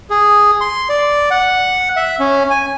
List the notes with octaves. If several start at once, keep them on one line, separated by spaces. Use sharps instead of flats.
G#4
C6
D5
F#5
E5
C#4
G#5